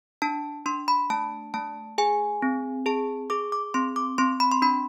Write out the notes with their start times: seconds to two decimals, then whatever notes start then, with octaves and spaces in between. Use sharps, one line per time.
0.22 D4 A5
0.66 D4 C6
0.88 B5
1.10 A3 A5
1.54 A3 A5
1.98 G#4 G#5
2.42 C4
2.86 G#4 A5
3.30 G#4 D6
3.52 D6
3.74 C4 C6
3.96 D6
4.18 C4 C6
4.40 B5
4.51 C6
4.62 D4 B5